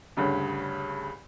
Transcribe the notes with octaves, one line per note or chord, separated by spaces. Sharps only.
D2 G2 C#3